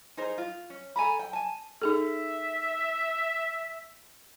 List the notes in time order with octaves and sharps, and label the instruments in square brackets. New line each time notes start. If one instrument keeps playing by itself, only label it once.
[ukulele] D#4 G#4 A#4 C5
F4
C#4
A4 G#5 A#5 B5
G5
G#5 A5
[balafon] D#4 G#4 A4 [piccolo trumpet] E5